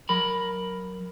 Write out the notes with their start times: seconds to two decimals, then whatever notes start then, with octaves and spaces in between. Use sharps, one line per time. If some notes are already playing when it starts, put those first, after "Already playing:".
0.09 F#3 A#4 B5